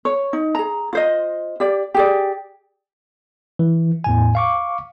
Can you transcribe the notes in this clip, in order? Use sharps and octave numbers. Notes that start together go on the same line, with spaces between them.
C#5
D#4
G#4 A#5
F4 C5 D#5
G4 D5
G4 G#4 D5
E3
E2 A2 G#5
F5 C#6 D6